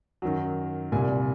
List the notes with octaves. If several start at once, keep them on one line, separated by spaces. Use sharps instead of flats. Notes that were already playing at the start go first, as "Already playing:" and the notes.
F#2 D#3 F#3
C2 A#2 G3 G#5